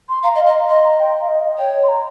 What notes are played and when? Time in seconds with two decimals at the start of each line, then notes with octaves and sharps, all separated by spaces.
0.09 C6
0.23 F5 A#5
0.35 D#5
0.39 F5
0.46 D#5
0.69 D#5 C6
0.84 A#5
0.99 G5
1.21 F5
1.28 D#5
1.43 D#5
1.58 C#5 G5
1.83 C6
1.88 A#5